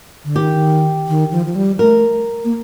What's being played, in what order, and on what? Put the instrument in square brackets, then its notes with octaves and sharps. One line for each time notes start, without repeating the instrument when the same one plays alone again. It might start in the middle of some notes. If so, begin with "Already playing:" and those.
[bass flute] D3
[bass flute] D#3 [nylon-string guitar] G4
[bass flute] D#3
F3
F3
G3
[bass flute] A3 [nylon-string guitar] A#4
[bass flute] A#3